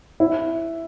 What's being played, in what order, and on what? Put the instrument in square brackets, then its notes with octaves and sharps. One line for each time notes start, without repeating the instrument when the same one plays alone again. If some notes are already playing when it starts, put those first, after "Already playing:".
[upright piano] E4